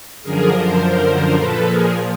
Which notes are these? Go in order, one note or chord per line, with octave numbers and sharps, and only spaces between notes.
F#2 D3 F3 G#4 A#4
A#4 C5
A#2 F3 A4 B4
G#4 A#4